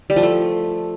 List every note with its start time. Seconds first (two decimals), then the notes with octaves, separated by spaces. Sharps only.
0.10 G3
0.16 F3
0.23 A3